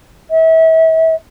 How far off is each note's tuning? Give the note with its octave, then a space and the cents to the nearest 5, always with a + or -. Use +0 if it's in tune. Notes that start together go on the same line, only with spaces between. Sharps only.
E5 -35